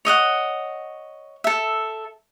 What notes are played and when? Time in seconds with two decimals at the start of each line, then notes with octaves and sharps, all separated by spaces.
0.05 C#5 D#5 E5 F#5
1.44 A4 E5